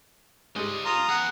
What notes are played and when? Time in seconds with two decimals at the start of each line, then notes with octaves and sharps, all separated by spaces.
0.56 G#2 G3 G#3 C#4 D#5
0.85 F4 A#5 C6 D#6
1.09 B3 G#4 F#5